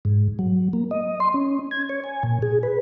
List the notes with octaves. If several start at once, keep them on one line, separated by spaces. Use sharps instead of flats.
G#2
F#3
A#3
D#5
C6
C#4
G#6
C#5
G#5
A#2
G#4
B4